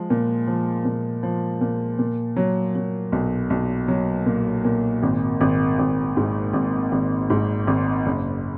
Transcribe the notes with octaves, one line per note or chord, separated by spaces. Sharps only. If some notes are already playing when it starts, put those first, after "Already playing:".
Already playing: F3 G#3
A#2
F3
A#2
F3
A#2
A#2
F#3
F#3
B1
B1
F#3
A#2
A#2
G#1
G#1
G#1
G#2
G#1
G#1
G#2
G#1
F#1